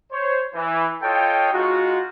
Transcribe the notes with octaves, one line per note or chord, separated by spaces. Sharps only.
C5 C#5
E3
F4 A4 C#5 D#5 G5
G#3 D#4 F4 F#4